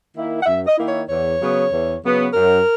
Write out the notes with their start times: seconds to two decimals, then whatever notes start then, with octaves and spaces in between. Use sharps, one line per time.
0.15 D#3 A#3 E4
0.42 F#5
0.46 F#2 E5
0.67 D#5
0.78 D#3 A#3 E4
0.88 C#5
1.09 E2 C#5
1.40 C#3 F#3 B3
1.71 E2
2.03 C#3 F#3 B3
2.34 F#2 A#4